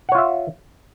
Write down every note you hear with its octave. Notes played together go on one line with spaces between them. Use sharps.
F4 C#5 E5 F#5